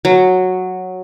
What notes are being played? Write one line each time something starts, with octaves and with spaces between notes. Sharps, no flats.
F#3